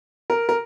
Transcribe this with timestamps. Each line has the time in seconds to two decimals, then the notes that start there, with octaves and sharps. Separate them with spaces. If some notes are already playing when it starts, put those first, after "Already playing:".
0.30 A#4
0.49 A#4